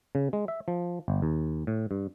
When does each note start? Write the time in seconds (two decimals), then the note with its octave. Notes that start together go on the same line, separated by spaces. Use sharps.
0.15 C#3
0.33 G#3
0.48 E5
0.68 F3
1.08 G1
1.22 D#2
1.67 A2
1.91 G2